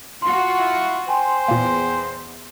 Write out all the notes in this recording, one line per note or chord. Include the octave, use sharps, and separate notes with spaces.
F4 F#4 C6
E4
C5 G5 G#5 C6
E2 A#2 A#3